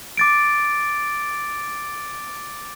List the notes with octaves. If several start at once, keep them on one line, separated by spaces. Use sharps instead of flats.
D6 A6 D7